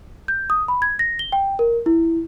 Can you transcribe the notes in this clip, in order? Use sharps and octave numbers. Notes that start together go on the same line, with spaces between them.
G6
D#6
B5
G#6
A#6
G7
G5
A#4
E4